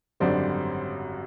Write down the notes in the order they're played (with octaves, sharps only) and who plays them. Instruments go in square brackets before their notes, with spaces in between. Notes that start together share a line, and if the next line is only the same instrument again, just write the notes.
[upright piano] G#1 F#2 D3 G3 C5 D5